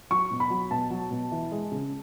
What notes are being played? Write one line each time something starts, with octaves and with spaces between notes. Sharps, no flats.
F#3 C#6
B2
B5
F#3
B2 A5
F#3
B2
E3
G#3
C#3